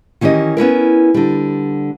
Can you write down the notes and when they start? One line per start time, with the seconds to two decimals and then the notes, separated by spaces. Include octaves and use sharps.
0.21 D#3 E3 C#4 G4 D#5
0.57 B3 C#4 E4 A#4
1.14 D3 G3